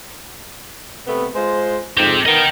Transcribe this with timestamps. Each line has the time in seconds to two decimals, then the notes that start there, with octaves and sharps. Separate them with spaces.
1.07 C3 A3 B3
1.35 G#3 F4 C5
1.98 F2 G#2 C4 G4
2.26 D#3 B3 A#4 D#5 G5